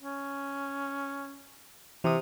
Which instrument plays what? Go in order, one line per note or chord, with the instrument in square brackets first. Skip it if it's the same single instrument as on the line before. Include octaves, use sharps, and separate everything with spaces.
[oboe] C#4
[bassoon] C3 [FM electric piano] E3 D#6